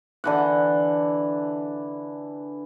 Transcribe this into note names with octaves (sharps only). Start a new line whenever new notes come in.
D3 E3 F#5